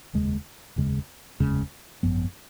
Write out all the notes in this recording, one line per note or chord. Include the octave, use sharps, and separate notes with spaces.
F1 D#2 C#3 G#3
F1 D#2 C#3 G#3
F1 D#2 C#3 G#3
G#1 F#2 F3 B3